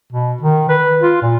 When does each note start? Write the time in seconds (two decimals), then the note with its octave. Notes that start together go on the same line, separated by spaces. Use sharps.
0.12 B2
0.42 D#3
0.69 B4
1.01 F4
1.22 A#2